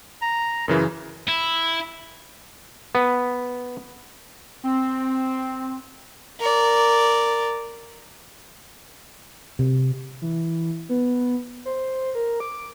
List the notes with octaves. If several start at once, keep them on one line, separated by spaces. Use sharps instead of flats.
A#5
F#2 C#3 E3 A#4
E4
B3
C4
A#4 D5
C3
E3
B3
C5
A#4
D6